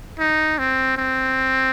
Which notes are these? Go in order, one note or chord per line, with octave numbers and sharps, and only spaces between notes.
D#4
C4
C4